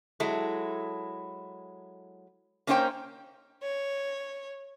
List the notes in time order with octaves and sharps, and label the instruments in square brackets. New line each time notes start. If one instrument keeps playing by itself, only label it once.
[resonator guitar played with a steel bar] F#3 G#3 E4 A4
A#3 C#4 D#4 E4 C5 G5
[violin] C#5